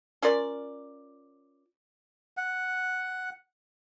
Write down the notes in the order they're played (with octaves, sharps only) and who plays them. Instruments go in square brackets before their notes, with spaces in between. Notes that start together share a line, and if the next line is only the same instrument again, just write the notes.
[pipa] C#4 F4 A#4 D5
[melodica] F#5